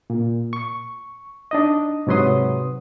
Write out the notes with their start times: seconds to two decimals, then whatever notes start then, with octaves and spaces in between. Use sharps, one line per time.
0.10 A#2
0.53 C#6
1.51 D4 D#4 D#5
2.07 G#2 C3 F#3 B4 C6 D#6